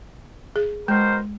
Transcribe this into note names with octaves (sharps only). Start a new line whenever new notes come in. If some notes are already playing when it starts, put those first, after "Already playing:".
G#4
B2 G#3 A#4 C5